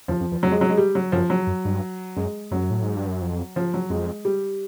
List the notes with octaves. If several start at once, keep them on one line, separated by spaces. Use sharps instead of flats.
E2 F3
F2
E2
F2 F#3
G#3
F#3
G#3
G3
F#3
F#2 F3
F#3
F#2
G2
F#2 G#3
F#2 F#3
A2
G#2
G2
F#2
F2
F3
F#3
F2 G#3
G3